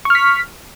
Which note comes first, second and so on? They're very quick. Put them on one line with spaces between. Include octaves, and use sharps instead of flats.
C#6 F6 B6